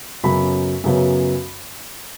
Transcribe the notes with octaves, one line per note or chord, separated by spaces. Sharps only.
F#2 C#3 F#3 B3 B5
F#2 C#3 F#3 B3